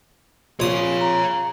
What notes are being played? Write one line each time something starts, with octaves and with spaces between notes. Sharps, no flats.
A#1 C#5 F5 D#6
A#5